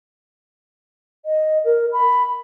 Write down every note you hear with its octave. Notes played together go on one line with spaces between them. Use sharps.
D#5
A#4
B5